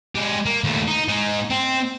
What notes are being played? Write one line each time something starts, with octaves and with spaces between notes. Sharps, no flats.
G#3 G4
A#3
D#2 A3
D#4
G#3 D#4
C4